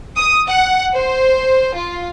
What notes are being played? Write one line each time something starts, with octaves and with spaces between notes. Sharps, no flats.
D#6
F#5
C5
F4